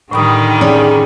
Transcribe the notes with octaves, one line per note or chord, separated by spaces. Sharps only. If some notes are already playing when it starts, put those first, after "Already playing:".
A2 D3 D#3 G3 B5 D#6
C#4 G#4 D5